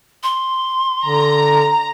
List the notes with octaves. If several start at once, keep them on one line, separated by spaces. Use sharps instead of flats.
C6
D3 A#5